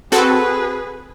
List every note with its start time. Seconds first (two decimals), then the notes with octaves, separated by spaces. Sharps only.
0.12 C4 F#4 G#4 A4 B4